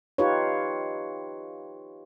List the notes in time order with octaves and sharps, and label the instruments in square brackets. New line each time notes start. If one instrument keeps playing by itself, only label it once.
[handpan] D#4 F4 G4 B4 C#5